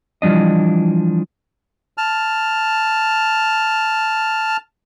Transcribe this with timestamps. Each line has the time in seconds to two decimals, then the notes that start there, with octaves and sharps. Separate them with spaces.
0.22 E3 F3 G3 D4 D#5
1.98 A5 F6